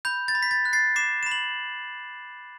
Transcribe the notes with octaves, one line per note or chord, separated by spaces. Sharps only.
B5 G6
A6
B5
B6
A6
F#6
A6 C7
D6 C7 E7
B5 E7
F#7